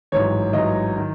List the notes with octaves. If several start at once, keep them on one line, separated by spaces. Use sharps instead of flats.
A1 G#2 F#3 C#5
A1 G#2 F#3 D#5
D#3